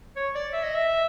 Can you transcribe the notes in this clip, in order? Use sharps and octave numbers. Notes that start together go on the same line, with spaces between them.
C#5
D5
E5
D#5
E5